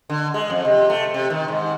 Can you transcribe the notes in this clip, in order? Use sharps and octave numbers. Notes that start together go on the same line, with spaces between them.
D3
G#3
F2
C3
A3
C3
D#3
G#2